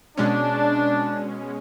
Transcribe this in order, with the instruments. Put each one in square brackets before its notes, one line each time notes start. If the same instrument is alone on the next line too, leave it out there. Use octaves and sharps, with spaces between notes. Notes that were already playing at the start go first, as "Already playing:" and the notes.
[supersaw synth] B2 G#3 C#4 [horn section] D4